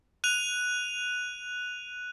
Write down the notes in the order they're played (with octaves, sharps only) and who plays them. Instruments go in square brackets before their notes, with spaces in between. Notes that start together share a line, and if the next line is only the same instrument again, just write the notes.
[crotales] F#6 D#7 F7